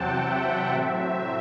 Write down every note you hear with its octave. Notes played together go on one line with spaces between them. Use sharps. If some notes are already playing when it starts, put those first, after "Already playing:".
Already playing: E2 C3 F#3 C4 F#5 G5 A5
E5
A2 F#3 C4